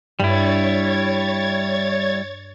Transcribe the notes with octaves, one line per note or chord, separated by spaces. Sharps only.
G2 G3 E4 C#5 G#6 A6